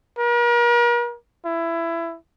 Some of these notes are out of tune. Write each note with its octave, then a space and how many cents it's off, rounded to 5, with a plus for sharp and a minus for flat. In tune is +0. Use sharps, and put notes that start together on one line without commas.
A#4 +40
E4 +20